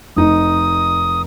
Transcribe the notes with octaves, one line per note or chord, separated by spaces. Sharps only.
F1 D#4 D#6